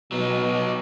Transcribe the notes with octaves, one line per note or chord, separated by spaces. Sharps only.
B2 F#3 D#4